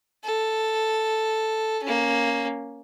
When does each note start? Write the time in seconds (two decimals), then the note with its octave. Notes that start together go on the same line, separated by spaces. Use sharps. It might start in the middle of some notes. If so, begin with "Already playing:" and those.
0.24 A4
1.83 A#3 C#4